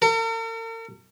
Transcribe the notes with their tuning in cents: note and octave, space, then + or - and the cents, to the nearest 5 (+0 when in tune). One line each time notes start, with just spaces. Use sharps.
A#4 -45